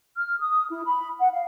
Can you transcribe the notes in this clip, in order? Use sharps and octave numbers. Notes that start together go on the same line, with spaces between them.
F6
D#6
E4
B5
F#5
F5